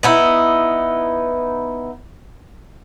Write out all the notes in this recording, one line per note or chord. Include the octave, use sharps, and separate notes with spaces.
B3 D#4 E4